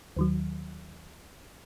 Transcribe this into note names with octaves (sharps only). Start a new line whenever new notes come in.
D#2 D#3 F#3